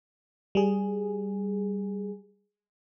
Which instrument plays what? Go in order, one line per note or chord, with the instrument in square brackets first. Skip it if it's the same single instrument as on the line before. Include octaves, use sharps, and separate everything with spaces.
[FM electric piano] G3 G#4